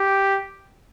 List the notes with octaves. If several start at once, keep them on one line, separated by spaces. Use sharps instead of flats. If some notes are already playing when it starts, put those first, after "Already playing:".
Already playing: G4